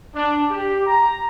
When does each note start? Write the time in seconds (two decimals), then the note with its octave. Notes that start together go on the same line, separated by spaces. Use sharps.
0.15 D4
0.51 G4
0.87 A#5